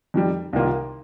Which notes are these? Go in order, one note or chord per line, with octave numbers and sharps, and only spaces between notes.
F2 D#3 G3
C2 C3 D#3 A#3 F4